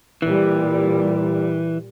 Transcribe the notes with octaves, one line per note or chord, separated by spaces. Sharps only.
A#2 E3 G3